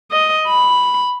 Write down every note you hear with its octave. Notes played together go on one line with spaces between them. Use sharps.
D#5
B5